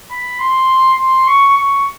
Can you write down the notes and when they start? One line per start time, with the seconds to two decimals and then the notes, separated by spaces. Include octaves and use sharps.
0.10 B5
0.39 C6
0.98 C6
1.27 C#6
1.57 C#6